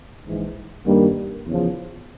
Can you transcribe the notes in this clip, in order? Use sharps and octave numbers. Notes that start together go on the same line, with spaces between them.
A#1 G#2 E3
G2 D#3 G3 A#3
E2 C#3 F3